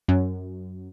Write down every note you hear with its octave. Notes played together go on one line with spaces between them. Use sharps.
F#2